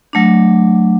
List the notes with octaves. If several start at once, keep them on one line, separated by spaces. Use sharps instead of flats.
F#3 A3 D4